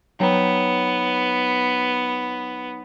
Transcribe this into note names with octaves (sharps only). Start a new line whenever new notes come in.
F#3 B3 D#4 G5